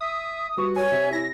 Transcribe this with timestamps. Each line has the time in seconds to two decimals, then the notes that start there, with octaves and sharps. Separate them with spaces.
0.01 E5 D#6
0.57 G3 F#4 B4 C#6
0.76 C#5 G#5
0.91 C3 G4 E5
1.13 E4 A#6